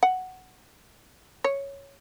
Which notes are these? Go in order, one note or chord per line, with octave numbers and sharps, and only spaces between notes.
F#5
C#5